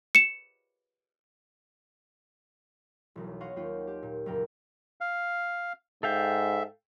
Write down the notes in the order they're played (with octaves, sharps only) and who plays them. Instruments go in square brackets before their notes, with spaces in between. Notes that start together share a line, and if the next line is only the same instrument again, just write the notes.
[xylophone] C#7 E7
[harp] E1 B1
C#5 D#5 F5 F#5 C6 C#6
D#2 F4 F#5 G5
G4
A#2
F#1 F2 A#4 G5
[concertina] F5
[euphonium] G#2 [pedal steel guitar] A4 F5 G5 [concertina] E5